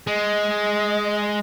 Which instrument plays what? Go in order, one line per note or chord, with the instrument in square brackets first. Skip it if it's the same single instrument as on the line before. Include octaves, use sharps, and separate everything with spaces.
[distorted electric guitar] G#3 [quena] D#5